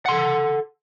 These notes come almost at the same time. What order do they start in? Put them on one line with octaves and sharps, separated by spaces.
F#5 C6 A4